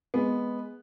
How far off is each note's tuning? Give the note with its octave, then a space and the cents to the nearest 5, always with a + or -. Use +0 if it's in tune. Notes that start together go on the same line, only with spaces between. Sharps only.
G#3 +0 B3 +0